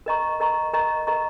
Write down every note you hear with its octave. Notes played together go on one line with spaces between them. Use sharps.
A#4 D#5 A#5 C#6
A#4 D#5 A#5 C#6
A#4 D#5 A#5 C#6
A#4 D#5 A#5 C#6